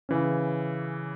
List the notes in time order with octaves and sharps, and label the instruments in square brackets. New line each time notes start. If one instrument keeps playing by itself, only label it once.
[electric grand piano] C#3 E3 C#4